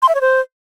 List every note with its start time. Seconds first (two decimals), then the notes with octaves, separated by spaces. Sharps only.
0.02 C6
0.09 E5
0.15 C#5
0.21 C5